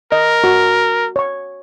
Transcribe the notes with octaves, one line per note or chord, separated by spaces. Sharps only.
A#4 D#5
F#4
C#5 C#6